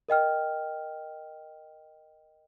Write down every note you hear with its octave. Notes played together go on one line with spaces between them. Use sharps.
A#4 D#5 G5 F6